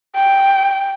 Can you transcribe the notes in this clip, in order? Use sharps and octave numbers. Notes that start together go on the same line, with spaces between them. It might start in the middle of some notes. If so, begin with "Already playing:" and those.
G5